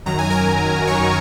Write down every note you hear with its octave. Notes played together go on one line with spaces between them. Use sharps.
F#2 D#3 F#3 A#5
G#5
A#4 A#5
F#2 D#3 F#3 C#5 C#6